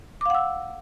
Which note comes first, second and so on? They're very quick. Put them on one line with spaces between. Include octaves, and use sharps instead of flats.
D6 F5 F#5 E6